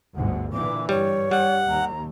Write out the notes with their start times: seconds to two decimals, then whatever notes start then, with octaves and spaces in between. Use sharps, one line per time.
0.16 G1 D2 G#2 F#5
0.53 A#2 D3 E3 D6
0.89 G2 G3 C#5
1.31 G3 F#5
1.69 D#2 A#5